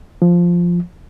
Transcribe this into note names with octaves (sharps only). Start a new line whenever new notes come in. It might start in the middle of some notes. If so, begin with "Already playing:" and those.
F3